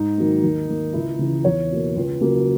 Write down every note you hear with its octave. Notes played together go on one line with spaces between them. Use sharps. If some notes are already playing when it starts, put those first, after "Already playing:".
Already playing: G#2 D#4
D#3 F#3 A#3
D#2
D#3 A#3
C#2 E4
C#3 E3
E2 C#5
B2 A#3
C#2
C#3 F#3 A#3